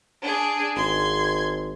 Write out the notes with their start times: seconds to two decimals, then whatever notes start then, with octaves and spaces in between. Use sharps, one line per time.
0.21 D4 G#4
0.76 G#1 C6 G#6